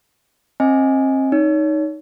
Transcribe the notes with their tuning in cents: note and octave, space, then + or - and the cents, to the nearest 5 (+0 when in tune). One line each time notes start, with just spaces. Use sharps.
C4 +35 D#5 +15 G#5 +0
D#4 +0 C#5 +30